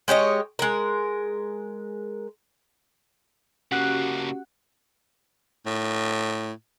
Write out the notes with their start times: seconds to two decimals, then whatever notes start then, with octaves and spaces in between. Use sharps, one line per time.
0.08 G#3 G4 C#5 D#5
0.59 G#3 A#4
3.72 C#3 A#3 C#4 F#4 G4 F#5 F#6
5.66 A2